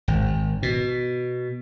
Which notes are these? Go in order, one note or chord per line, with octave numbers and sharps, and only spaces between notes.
G#1
B2